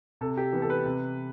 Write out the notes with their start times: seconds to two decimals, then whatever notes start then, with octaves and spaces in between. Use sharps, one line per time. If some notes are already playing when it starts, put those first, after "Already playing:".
0.21 C3 A4
0.37 G4
0.53 E3 B3
0.62 A4
0.70 B4
0.85 C3